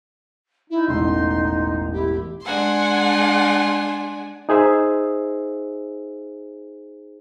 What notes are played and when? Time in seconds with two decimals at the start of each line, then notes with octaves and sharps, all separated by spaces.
0.70 D#4 E4
0.88 E1 A1 C6
1.92 E4 G4
2.45 G#3 D4 F#5 G#5 C6
4.49 D#4 G#4 C5 E5